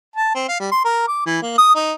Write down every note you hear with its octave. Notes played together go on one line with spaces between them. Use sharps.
A5
C4
F5
G3
C6
A#4
D6
E3
A#3
D#6
D#4